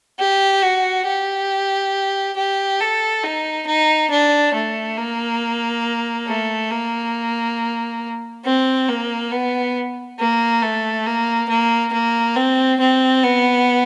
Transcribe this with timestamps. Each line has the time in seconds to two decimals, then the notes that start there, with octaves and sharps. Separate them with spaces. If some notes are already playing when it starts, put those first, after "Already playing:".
0.19 G4
0.63 F#4
1.06 G4
2.36 G4
2.80 A4
3.23 D#4
3.67 D#4
4.10 D4
4.54 A3
4.97 A#3
6.28 A3
6.71 A#3
8.45 C4
8.89 A#3
9.31 B3
10.19 A#3
10.62 A3
11.06 A#3
11.49 A#3
11.93 A#3
12.36 C4
12.80 C4
13.24 B3